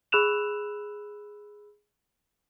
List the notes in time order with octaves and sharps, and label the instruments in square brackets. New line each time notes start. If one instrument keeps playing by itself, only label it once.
[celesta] G#4 B5 E6 F#6 E7 F7